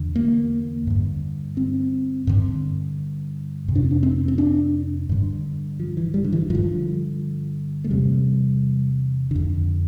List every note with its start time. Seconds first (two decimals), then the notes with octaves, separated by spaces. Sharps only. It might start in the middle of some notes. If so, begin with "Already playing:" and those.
Already playing: E2 D3
0.16 A#3
0.87 G2 D3
1.57 C4
2.27 G2 D3
3.68 F2 C3
3.76 D4
3.84 C4
3.91 D4
4.03 C4
4.28 C4
4.38 D4
5.09 G2 D3
5.80 F3
5.97 E3
6.14 G3
6.24 D3
6.32 E3
6.50 G2 D3 F3
7.84 A3
7.90 E2 C3 G3
9.31 F2 D3